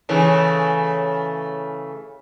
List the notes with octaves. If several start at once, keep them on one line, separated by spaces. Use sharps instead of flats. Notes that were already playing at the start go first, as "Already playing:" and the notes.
C#3 E3 A3